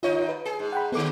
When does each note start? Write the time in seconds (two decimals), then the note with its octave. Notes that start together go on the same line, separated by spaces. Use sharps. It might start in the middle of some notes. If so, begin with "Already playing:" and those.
0.03 D#2 D#4 F4 C#5 D#5
0.29 B4
0.45 G#4
0.59 G#2
0.73 F#5 G5 B5
0.92 D3 F#3 G#3 B3 A4 D6